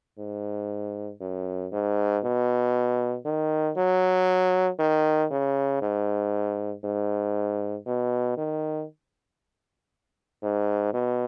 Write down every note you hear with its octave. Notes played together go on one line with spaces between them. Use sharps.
G#2
F#2
G#2
B2
D#3
F#3
D#3
C#3
G#2
G#2
B2
D#3
G#2
B2